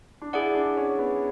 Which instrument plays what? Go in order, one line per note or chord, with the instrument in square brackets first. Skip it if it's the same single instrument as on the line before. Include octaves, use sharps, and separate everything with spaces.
[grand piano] D4
[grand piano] E4 [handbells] G#4 D5 F#5
[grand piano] D4
C#4
B3